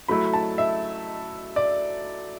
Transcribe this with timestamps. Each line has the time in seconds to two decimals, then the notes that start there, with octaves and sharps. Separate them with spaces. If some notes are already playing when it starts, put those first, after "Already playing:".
0.08 F#3 A3 E4 B5
0.34 A5
0.58 E5
1.56 D5